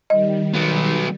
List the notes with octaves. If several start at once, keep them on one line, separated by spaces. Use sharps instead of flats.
D#3 G3 D#5
F#3 B3